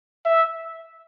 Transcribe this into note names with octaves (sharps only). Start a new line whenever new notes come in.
E5